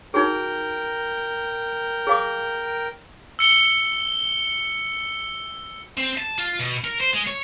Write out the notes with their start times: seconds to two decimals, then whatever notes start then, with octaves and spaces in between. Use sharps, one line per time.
0.14 D#4 F#4 G#4 A#4 G5
2.07 G#4 F5 D6
3.39 E6 C#7 G7
5.97 C4
6.18 A5
6.38 F4
6.59 B2
6.84 A#4
7.00 C5
7.14 G#3
7.28 C#5